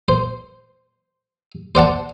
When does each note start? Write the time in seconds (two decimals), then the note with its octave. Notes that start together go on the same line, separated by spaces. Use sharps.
0.08 C5
1.75 C5 D5 F#5 A5